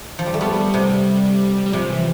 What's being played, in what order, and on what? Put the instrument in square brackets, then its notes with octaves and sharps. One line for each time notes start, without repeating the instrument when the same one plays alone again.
[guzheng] F3
G3
A3
[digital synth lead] G3 [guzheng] B3
[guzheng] C3
[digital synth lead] G3
[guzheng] C3 [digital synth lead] F3
[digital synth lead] E3